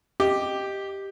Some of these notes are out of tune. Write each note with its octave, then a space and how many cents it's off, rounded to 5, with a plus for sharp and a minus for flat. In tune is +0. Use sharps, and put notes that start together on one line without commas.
G4 +0 D#5 -5